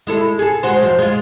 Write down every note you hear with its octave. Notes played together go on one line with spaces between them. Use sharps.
G#3 E4 A4
G#4 A4
G#3 F#4 C5
F#2 F3
G#3 F4